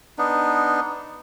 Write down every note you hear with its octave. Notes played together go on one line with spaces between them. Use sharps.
B3 D4 D#4